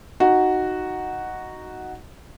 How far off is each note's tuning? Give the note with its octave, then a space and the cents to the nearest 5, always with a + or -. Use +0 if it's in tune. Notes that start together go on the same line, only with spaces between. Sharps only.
D#4 +0 F#4 +0